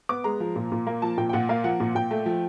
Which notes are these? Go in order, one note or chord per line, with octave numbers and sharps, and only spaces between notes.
B3 D6
G#3 A#5
F3
A#2
A#2
A#3
F3 A5
A#2 G5
G5
A#2 F#5
A#3 F5
F3 F#5
A#2
A#2 G5
A3
F3